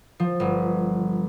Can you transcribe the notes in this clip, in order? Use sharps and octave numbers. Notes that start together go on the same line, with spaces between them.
F3
G1